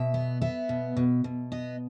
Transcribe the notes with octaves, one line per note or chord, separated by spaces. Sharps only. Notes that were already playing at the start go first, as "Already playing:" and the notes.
Already playing: B2 E5
B3
B3 E5
B2
B2
B2
B3 D#5